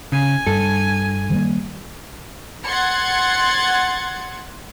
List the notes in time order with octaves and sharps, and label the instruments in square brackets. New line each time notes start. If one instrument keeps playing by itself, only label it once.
[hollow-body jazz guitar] C#3 [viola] G#5
[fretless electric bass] G2 [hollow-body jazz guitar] A4
[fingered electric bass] D#3 G3 A#3
[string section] F#5 C6 G#6 A6 C#7